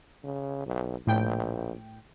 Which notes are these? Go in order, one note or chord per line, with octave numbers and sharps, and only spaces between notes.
C#3
B1
A#1 A2 G5